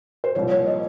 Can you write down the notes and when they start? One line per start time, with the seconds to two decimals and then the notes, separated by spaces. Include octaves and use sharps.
0.24 C5
0.35 C2 A#2 F3 C#5
0.51 C#5
0.66 D#5